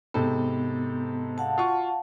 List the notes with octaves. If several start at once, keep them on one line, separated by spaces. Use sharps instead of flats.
G#2 C3 B3 A4
F5 F#5 A5
F4 F#4 C#6